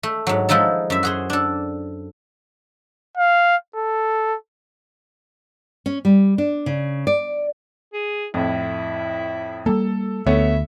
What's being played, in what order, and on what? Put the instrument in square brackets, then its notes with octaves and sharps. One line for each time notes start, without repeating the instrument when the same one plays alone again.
[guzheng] A3
G#2 F#3
F3 G#3 D#4 E4 A4
F#2 E5
F#4 G#4 C5
D4 A4
[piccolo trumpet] F5
A4
[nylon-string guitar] C#4
G3
D4
C#3
D5
[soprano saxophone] G#4
[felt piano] F2 A2 [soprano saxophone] E4
[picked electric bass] G3 A#3 [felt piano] A4
[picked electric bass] D2 [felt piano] A3 B3 C#5 [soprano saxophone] E5